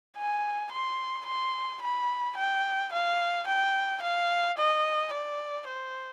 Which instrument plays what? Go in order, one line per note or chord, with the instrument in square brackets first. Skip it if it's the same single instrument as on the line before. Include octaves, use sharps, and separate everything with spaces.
[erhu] G#5
C6
C6
B5
G5
F5
G5
F5
D#5
D5
C5